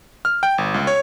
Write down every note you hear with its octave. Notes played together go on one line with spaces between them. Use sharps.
F6
G5
G1
C#2
C#5